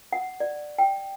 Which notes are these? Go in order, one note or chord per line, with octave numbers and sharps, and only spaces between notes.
F#5
D5
G5